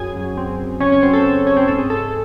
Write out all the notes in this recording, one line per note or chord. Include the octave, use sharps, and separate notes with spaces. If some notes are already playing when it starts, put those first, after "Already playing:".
Already playing: F#2 G#4 G#5
F#3
C4
F#2
C#3 C#4 C#5
C#4 C#5
F#3 C4 C5
A4
C4 A4
C#3 C#4 C#5
C4 C5
G#2 A4
G#4
G#2 A4